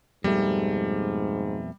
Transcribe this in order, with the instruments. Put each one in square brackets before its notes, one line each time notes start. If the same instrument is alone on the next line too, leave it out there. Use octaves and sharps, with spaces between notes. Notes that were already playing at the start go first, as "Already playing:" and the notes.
[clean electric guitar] F2 B2 A3 [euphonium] G#2 [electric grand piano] G3